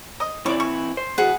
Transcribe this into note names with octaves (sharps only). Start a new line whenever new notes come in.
D#5
E3 C4 E4 C#5 D5 D6
G#5 C#6
C5
E2 F#4 G#4 B4 F#5